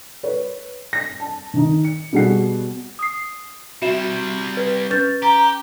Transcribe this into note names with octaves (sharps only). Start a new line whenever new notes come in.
B4 C#5
A#6
A5
D#3 D#4
C#7
B2 G3 F#4 G#4 F#5 C7
D#6 C7
C3 G3 F#4 E5 E7
B4
C#4 B4 G6 A6
G4 A#5